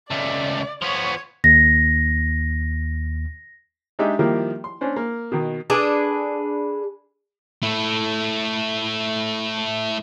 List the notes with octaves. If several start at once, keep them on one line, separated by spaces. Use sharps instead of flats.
C#2 A3 D5
F3 B3 C#5
D#2 A#6
G#3 D4 D#4 G4 E5
D#3 F3 G3 A#3 E4 G4
C6
C#4 D4 C5
A#3
B2 D#3
D4 G#4 A4 B4
A3 E4